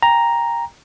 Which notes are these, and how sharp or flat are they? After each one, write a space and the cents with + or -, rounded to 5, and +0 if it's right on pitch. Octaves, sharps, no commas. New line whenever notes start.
G5 +25 A#5 +0